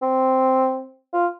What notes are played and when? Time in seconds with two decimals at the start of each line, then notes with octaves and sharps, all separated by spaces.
0.02 C4
1.13 F4